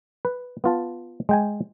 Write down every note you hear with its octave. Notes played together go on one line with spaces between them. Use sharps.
B4
B3 F4 A5
G#3 G5 G#5